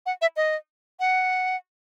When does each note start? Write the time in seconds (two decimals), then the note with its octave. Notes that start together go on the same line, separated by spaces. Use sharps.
0.06 F#5
0.22 E5
0.36 D#5
1.00 F#5